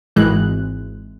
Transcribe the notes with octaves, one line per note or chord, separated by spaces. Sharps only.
G#1 E3 G#3 F#6